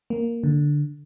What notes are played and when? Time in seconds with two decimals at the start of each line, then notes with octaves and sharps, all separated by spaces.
0.10 A#3
0.44 D3